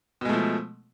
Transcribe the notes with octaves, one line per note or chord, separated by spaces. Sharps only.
B2 F3 G#3 A3